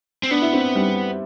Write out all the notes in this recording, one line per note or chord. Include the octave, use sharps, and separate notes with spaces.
C4
B3 D4
E4
C4
G3